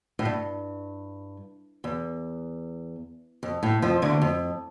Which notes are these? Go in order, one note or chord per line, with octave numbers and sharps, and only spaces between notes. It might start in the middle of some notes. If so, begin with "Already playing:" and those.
A2
G2
E2
F2
A2
F2 F3
D2 D3
F2